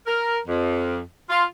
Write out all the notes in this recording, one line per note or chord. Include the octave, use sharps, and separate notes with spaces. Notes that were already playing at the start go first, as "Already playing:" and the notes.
A#4
F2
F4